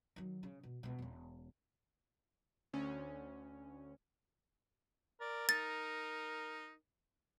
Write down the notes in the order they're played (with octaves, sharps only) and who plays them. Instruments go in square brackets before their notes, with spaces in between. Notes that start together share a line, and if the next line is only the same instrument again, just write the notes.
[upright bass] D#3 F#3
C#3
B2
C#2 B2
E1 C#4
[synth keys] D2 C#4
[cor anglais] A#4 [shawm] D5
[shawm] D#4 [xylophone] A6